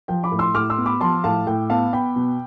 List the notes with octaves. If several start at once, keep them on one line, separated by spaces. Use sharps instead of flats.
F3 G5
B5 D6
A2
C6 E6
A2 D6 F6
C6 E6
B3
B5 D6
F3 A5 C6
A2 F5 A5
A2 G5
B3 F5 A5
B3 G5 B5
B2